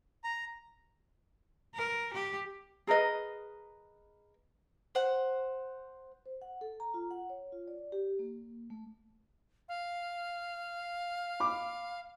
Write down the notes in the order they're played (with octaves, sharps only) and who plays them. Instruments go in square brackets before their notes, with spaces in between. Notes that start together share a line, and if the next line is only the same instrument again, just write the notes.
[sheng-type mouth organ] A#5
[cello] A#4
G4
[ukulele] G#4 A#4 B4 D#5
[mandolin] C5 F#5
[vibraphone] C5
F#5
A4
A#5
F4
F#5
C#5
F4
D5
G4
A#3
A3
[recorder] F5
[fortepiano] B5 D6